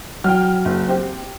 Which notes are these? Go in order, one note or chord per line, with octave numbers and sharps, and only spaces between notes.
F#3 G5 F6
F#1
C4 G4